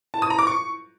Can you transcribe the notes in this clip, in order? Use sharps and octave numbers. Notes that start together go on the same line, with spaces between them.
A5
D#6
A#5
D6
C#6